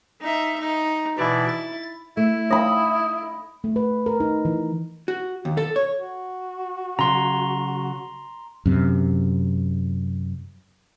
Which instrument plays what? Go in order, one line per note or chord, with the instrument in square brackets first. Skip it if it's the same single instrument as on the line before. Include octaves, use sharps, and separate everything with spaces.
[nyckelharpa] D#4 E5
D#4
[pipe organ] B2 E3 D5 [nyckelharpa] E4
[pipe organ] A6
[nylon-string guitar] A3 [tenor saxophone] E4
[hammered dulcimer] D#5 B5
[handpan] A3
B4
A#4
D#4
E3
[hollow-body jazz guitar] F#4
D#2
A4
C#5
[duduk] F#4
[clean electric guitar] C#3 F#3 [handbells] A#5 C6
[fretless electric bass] F#2 C3